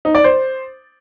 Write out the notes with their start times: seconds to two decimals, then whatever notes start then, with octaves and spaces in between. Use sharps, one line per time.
0.05 D#4
0.15 D5
0.24 C5